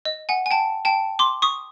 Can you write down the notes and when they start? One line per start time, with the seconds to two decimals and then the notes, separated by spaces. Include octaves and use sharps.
0.05 D#5
0.29 F#5 G#5
0.46 G#5
0.51 G5 A5
0.85 G5 A5
1.19 C6 D6
1.42 C#6 D#6